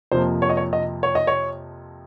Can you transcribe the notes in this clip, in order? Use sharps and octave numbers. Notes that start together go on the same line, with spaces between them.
F2 C3 F3 A#3 C5
C#5
D#5
C#5
D#5
C#5
D#5
C#5